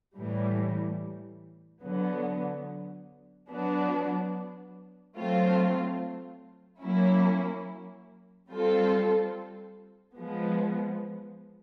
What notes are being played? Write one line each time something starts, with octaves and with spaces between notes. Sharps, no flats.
A2 E3 G3
D3 F#3 B3
F#3 B3 D4
F#3 A3 C4 F4
F#3 A#3 C#4 E4
G3 C4 F4 A4
F3 G#3 B3